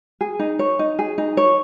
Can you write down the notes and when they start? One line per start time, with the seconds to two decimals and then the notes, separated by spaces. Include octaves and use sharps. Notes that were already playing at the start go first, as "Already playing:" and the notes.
0.21 G#4
0.39 D#4
0.59 C#5
0.79 D#4
0.99 G#4
1.18 D#4
1.37 C#5